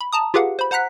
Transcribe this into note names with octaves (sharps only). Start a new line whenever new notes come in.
B5
A5 A#5 D#6
F4 G4 G#4 B4 F5 F#5
C5 B5
C5 F#5 A#5 F#6 B6